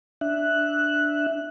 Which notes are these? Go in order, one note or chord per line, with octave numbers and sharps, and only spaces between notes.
D4 E5 F#6